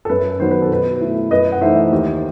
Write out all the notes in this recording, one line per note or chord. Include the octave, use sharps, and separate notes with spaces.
A4
F#2 B4
D#3 F#3 B3 C5
B4
A4
B2 B4
A3 E4
F#2 B4 D#5
F#5
E3 A3 D#4 C5 E5
D#2